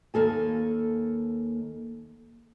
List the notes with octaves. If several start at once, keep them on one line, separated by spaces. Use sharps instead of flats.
D#2 A#3 A4 G#5